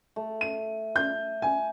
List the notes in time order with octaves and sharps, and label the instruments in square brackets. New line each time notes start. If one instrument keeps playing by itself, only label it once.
[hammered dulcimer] A3
[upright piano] D#7
G6
G#5